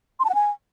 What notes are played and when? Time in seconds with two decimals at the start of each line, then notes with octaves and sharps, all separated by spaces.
0.20 C6
0.25 A5
0.30 F#5
0.35 G#5